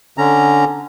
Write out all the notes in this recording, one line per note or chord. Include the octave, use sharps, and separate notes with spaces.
D3 C#4 A#5